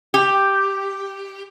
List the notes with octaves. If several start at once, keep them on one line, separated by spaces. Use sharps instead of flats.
G4